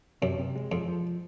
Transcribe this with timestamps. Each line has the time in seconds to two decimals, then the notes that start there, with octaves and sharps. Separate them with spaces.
0.22 F#2 C3
0.39 C3
0.56 G#3
0.72 F2 F3
0.88 F3